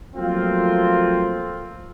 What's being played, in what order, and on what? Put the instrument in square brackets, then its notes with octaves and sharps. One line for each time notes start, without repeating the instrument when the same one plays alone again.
[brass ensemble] F3 F#3 A3 A#3 C4 F4